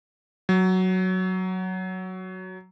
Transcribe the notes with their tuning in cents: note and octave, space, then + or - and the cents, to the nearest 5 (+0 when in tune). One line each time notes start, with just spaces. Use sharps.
F#3 +5